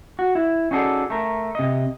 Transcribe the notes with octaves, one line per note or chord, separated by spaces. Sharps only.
F#4
E4
C#4 D#4 F#4 G#4 A4 D5
A3 A#4
C3 D#5